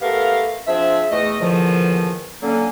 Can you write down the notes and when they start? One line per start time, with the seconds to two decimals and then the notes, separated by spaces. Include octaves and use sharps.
0.02 A3 B3 G4 A#4 F5
0.67 F3 C4 D4 G#4 E5
1.10 E2 A3 D#5
1.40 E2 A#2 D3 D#3 F3
2.42 D3 F#3 A#3 C#4